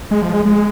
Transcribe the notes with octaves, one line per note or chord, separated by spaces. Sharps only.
G#3
F3
G#3
G#3